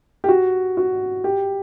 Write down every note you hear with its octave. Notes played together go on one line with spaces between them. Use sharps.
G4
F#4
F#4
G4